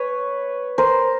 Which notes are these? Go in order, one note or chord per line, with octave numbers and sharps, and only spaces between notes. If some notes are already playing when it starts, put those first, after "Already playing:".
Already playing: B4 C#5
A#4 C5